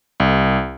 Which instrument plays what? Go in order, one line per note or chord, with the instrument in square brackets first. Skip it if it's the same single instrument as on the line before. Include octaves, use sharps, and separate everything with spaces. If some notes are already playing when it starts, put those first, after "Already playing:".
[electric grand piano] C2